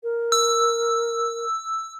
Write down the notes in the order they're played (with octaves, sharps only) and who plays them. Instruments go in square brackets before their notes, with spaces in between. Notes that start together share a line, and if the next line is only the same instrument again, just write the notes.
[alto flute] A#4
[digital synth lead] E6